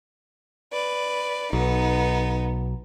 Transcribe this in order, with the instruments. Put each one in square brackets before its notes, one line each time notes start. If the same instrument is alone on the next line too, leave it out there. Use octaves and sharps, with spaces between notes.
[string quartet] B4 D5
[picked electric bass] B1 [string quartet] B3 D#4